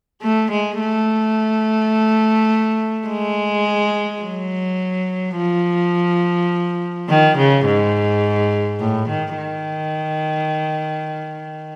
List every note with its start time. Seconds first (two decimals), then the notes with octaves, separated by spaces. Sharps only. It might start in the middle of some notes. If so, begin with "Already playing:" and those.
0.22 A3
0.51 G#3
0.79 A3
3.08 G#3
4.22 F#3
5.37 F3
7.09 D#3
7.37 C#3
7.66 G#2
8.80 A2
9.09 D#3
9.38 D#3